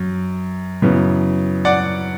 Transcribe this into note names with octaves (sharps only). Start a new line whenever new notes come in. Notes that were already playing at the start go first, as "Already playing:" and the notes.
Already playing: F#2
F#2 C#3 E3 B3
D5 F#5